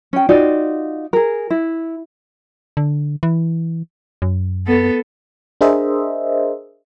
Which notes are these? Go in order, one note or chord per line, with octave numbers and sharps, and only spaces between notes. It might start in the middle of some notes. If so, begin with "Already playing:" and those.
C#4 G5
D#4 F4 F#4 D5
G#4 A#4
E4
D3
E3
F#2
B3 A4
D4 G#4 A#4 C5 D#5 E5